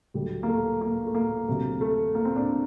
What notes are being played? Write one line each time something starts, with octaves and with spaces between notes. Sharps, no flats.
D2 D3 F#3 G3
A#3
A3
A#3
A3
A#3
D2 C3 F#3
A3
A#3
C4
D4